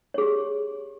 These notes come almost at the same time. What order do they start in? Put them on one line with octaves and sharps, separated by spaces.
C#5 G#4 G4